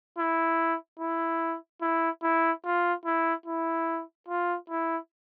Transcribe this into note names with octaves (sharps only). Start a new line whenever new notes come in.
E4
E4
E4
E4
F4
E4
E4
F4
E4